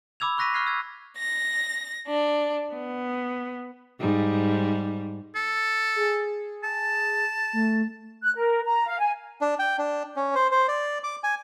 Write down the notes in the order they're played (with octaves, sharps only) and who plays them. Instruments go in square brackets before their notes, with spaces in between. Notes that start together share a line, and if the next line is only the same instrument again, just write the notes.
[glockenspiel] B5 D6 E6 G#6 F7
C#6 F#6 A#6 B6 D#7
C#6 F6 F#6 G#6 C7
E6 G#6
[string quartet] A#6
D4
B3
[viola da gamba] G#2 G3
[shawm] A4
[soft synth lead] G#4
[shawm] A5
[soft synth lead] A3
[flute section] F#6
A#4
A#5
F5
G#5
[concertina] D4
G5
D4
C#4
C5
C5
D5
D6
G#5